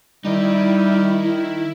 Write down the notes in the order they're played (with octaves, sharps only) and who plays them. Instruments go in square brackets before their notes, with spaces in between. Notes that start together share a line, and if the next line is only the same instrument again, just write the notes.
[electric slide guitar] D#3 D#4 [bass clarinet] G3 [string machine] E4